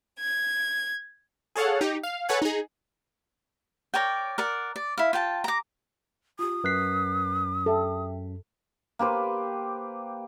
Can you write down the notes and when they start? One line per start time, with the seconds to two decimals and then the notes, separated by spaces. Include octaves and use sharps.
0.19 G#6
1.56 G#4 A4 C#5 F5 F#5
1.81 D#4 G4
2.03 F5
2.29 A4 B4 C#5 F#5 G#5
2.42 D#4 G#4
3.94 A#4 C#5 D5 G5
4.38 A#4 D5 F#5
4.76 D5
4.98 E4 F5
5.13 F4 G5 A5
5.44 A#5 D6
6.39 F4 G4 D#6
6.64 F#2 B4 F#6 B6 C7
7.66 G4 A4 E5 G5
8.99 A#3 G4 B4 C5